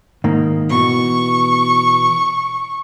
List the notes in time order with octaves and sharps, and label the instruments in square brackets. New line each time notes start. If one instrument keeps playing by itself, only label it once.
[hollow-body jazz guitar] G#2 D#3 A#3
[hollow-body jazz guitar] B2 E3 [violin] C#6